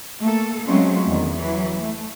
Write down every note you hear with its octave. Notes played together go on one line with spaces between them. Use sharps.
A3 A#3 A4
F#3 G#3 A3 C4 C#4 F4
E2 D3 D#3
E3 F#3
A3